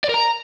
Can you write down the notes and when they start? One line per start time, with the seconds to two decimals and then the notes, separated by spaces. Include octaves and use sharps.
0.04 D5
0.09 A#4
0.14 A#5